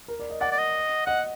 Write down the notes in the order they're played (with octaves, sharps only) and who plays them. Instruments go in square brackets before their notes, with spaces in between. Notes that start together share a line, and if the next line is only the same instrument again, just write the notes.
[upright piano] A#4
D5
D#5
[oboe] D5 [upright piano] F#5
[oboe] D5
D#5
[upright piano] D#5 [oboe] F#5